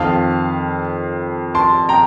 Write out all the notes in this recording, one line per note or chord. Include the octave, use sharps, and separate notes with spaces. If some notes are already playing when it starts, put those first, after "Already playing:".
Already playing: F2 D#3 F5 A5
A5 C6
G5 A#5